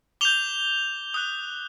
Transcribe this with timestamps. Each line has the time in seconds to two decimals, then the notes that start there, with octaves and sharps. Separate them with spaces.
0.21 D6 G6 F7 G7
1.14 D#6 F#6